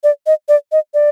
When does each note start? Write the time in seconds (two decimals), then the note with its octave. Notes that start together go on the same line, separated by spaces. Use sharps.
0.04 D5
0.27 D#5
0.49 D5
0.72 D#5
0.94 D5